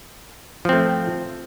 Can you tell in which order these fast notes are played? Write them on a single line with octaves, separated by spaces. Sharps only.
F3 C4 A3